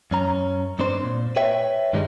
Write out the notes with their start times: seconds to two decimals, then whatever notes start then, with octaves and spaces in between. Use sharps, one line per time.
0.11 F#2 C#4 A#5
0.79 G2 C4 D4 C5
1.03 A#2
1.36 B4 C#5 E5 G5
1.93 G2 D#3 G3 G#3 B3 D#4